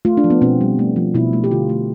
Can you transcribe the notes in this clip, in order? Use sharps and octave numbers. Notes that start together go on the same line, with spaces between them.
A3 F4
D4
F3
B3
B2 C4
G3
A3
F3
B2 E4
A3
G4
D3 F4
A3